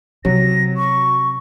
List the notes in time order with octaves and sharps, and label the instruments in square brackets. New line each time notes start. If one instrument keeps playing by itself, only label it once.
[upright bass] C3 [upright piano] F#3 [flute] A#6
[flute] C#6